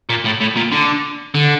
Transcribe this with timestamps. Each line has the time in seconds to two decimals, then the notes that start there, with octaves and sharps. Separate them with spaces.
0.09 A#2
0.25 A2
0.41 A2
0.57 A#2
0.72 D3
1.35 D3